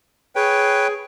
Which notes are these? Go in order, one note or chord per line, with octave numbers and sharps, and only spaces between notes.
G#4 B4 C#5 G5